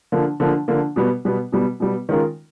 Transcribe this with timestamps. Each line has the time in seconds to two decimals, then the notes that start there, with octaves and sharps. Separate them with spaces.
0.12 D3 F3 A#3
0.40 D3 F3 A#3
0.68 D3 F3 A#3
0.96 B2 G3 B3
1.25 B2 G3 B3
1.52 B2 G3 B3
1.80 B2 G3 B3
2.09 D#3 G#3 C#4 F4 A#4